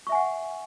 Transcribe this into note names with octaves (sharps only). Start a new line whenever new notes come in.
E5 F#5 G#5 C#6